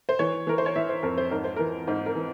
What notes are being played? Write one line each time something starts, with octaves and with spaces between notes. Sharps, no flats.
C5
E3 C#5
E3 A#4
C5
C#5
E3 E5
C5
F2 A#4
C5
G#2 A#4
C5
E3 A#4
G#2 C5
A#4
E3